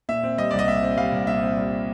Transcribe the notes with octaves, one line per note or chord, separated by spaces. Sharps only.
A#2 E5
C4
G3 D#5
C2 D5
D#5
A#2 E5
C4
G3 F5
C2
A#2 E5
C4
G3